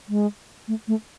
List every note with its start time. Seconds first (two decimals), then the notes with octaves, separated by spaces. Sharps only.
0.09 G#3
0.68 A3
0.88 A3